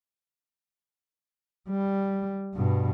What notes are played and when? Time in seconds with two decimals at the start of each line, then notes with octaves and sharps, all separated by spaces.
1.70 G3
2.54 G2 B2